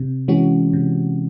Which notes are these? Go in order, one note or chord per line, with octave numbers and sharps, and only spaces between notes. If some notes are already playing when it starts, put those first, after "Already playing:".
Already playing: C3
E3 G#3 C#4 F#4
C3